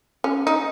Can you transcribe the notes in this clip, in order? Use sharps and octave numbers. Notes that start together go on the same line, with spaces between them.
C#4
D#4